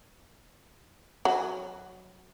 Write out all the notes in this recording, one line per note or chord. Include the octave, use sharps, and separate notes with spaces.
F#3